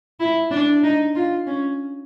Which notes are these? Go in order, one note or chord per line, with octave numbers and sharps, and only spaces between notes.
E4
D4
D#4
F4
C#4